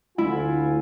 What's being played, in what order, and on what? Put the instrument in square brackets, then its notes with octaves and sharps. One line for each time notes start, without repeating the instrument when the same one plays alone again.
[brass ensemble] D2 F4 G#5 [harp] E4